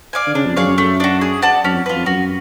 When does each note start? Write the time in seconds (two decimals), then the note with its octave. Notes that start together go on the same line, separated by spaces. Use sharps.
0.13 D5 F5 G#5
0.27 D3
0.35 C#3 D4
0.46 F2
0.57 F#2 G#4 C#5 F5
0.67 F#2
0.77 F#2 A3
1.00 D4 F#4
1.21 G#4
1.42 D5 F#5 A5
1.64 F#2 C#4
1.74 F2
1.86 F4 B4
1.96 F2
2.06 F#2 F#4